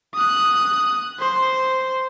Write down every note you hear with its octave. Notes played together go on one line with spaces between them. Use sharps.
D#6 F#6
C5